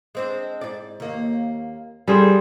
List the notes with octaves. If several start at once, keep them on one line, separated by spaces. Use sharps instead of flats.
G#3 C4 D4
G#2 D5
D#2 A#3
F3 G3 G#4 A4 C5